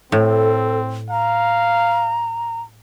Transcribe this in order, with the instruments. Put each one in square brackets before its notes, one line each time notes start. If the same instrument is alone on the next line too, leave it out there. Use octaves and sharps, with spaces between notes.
[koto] A2 [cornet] C4 [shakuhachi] A4
[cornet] F5 [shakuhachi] A#5